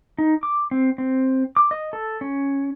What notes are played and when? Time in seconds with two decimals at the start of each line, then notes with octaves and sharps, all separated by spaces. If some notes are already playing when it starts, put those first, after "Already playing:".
0.18 D#4
0.43 D6
0.71 C4
0.98 C4
1.57 D6
1.71 D#5
1.93 A4
2.21 C#4